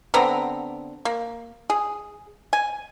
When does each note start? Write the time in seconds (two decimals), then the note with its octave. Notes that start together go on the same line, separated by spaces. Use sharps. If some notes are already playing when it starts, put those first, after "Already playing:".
0.14 D3 B3 C4 A#5
1.05 A#3
1.70 G#4
2.53 G#5